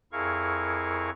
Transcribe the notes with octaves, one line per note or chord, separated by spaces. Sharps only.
F2 E4 G#4 A#4 F5 C#6